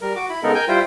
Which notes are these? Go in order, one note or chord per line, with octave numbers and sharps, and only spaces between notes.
G3 A#4
F#4 D6
E4 B5
C#3 G#3 B3 D#4 A4 A#4
A#4 G5 G#5 G6
G3 E4 F4 C5 G5